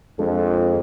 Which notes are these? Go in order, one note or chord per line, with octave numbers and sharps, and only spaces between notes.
F2 G#3 D4 F4 A4